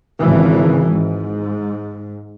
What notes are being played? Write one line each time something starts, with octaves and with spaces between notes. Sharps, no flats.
G#1 C#3 E3
G#2